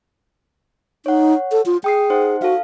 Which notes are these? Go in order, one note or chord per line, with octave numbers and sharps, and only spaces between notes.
D#4 C#5 F#5
A4
F4
G#4 G5 D#6 C7
D#4 C5 F#5
F#4 A4 F5